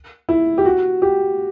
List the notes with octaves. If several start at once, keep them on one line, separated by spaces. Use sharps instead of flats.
E4
G4
F#4
G4